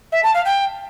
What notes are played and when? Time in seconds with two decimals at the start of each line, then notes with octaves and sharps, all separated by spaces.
0.12 E5
0.23 A5
0.34 F5
0.45 G5